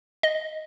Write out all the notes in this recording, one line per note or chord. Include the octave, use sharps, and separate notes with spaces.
D#5